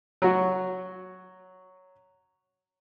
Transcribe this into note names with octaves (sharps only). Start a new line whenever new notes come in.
F#3 F#4